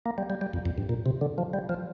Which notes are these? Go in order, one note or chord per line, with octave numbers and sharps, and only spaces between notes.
A#3
G3
G3
G3
F2
F2
G2
A#2
C3
D3
F3
G3
F3